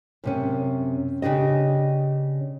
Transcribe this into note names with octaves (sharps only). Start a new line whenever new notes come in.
F#2 C3 C#4
C#3 D4 G4 D#5